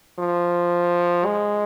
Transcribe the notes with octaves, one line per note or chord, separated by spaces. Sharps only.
F3
G#3